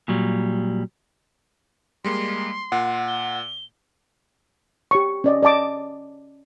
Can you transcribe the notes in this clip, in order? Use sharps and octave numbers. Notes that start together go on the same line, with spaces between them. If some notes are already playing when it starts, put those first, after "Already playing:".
A#2 F#3 G3
G3 G#3 A#3 C6
A#2 F#5
G7
G4 C#5 C#6
C#4 D5 D#5
D5 D#5 A5 D6